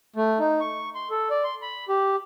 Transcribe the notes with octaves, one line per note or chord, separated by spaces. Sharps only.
A3
D#4
C#6
C6
A4
D5
C6
B5
G4